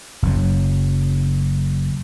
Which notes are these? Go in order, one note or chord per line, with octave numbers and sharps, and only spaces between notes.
F#1 F#2 F#3